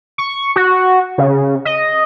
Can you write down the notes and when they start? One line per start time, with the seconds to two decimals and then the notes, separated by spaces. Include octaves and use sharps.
0.18 C#6
0.56 F#4
1.18 C#3
1.65 D#5